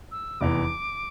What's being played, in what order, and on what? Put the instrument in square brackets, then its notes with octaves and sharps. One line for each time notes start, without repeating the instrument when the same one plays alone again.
[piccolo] E6
[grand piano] F1 E2 E3 [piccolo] D6